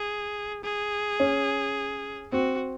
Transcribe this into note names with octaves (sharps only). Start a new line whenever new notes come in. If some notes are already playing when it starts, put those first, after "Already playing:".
Already playing: G#4
G#4
C#4
C4 F#4